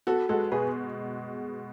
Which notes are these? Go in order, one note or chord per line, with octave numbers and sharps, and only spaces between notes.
B3 F#4 A4
G#3 F#4 A4
B2 G#4 B4